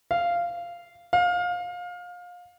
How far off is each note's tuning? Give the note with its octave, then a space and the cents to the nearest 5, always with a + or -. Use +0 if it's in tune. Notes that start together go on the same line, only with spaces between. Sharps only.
F5 -10
F5 +25